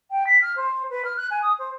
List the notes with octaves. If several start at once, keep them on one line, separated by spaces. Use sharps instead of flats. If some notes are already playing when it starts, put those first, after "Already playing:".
G5
B6
F6
C5
B4
F6
F#6
G#5
D#6
C5